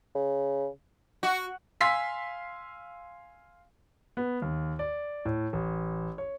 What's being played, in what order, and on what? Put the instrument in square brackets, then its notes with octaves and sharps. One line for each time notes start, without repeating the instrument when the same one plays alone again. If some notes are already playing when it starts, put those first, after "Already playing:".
[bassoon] C#3
[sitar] F#4
[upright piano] F5 G#5 C6 E6 B6
[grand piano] B3
D#2
D5
A2
A1
C#5